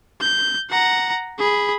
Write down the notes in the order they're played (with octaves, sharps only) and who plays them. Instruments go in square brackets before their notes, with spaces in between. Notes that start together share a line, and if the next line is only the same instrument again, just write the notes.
[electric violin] G6
F#5 A#5
G#4 B5